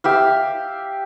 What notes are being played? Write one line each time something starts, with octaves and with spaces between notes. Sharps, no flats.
G4 E5 F5